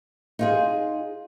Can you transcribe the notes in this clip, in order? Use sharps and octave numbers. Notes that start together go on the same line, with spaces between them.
D#4 F4 G#4